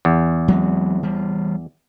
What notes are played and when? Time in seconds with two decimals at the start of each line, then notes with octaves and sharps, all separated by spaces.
0.05 E2
0.48 F#3 G#3 C4
1.03 E3 G3